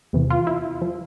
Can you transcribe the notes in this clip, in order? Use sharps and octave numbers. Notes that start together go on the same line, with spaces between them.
E2 C3 E3
F4
E4
F3